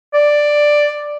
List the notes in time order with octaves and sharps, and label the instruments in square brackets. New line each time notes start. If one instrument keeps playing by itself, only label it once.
[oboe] D5